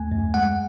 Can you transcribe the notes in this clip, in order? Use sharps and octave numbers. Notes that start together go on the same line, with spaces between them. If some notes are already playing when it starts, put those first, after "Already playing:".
Already playing: D#2 A3 G#5
F#2
G#3 F#5